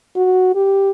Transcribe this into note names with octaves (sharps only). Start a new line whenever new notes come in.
F#4
G4